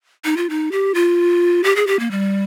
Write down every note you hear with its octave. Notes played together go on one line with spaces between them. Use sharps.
D#4
F4
D#4
G4
F4
G4
G#4
G4
A#3
G3